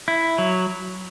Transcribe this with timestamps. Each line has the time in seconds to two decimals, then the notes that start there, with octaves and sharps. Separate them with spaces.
0.08 E4
0.38 F#3